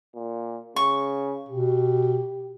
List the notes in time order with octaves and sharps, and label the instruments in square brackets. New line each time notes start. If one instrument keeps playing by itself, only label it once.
[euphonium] A#2
[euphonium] C#3 [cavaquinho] C#6
[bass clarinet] B2 [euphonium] G4